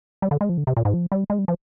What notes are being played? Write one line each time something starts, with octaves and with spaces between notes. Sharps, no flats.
G3
D3
G#3
F3
D3
C3
A#2
G#2
F3
G3
G#3
G3
F3